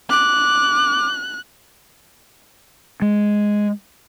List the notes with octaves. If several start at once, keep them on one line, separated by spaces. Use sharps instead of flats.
D6 F#6
G#3